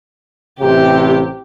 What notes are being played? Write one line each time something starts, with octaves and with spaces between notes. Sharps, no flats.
A1 C3 G4